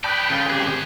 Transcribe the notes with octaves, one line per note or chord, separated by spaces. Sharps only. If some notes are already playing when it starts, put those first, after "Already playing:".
B4 D5 G5 A5 B5 D#6 F#6
D2 C#3 F4
D#3 C4 G4 G#4 F#6